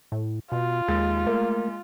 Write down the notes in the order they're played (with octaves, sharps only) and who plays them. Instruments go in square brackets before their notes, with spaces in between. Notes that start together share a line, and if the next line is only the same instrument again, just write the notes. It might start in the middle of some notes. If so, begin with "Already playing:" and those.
[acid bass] A2
[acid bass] B2 [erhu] F4
[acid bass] D#2 [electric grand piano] G#3 [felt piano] A6
[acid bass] A3 [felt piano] A#3